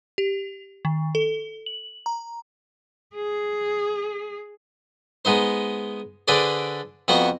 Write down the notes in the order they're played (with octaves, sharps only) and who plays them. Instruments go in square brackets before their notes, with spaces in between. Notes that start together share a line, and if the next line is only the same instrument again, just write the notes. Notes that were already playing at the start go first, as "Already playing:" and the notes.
[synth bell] G4
D#3
A4
F#7
A#5
[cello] G#4
[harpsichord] G#3 B3 D#4 C5
D3 D4 G#4 B4 C5 D5
F2 B3 F#4 F#5 A#5 C6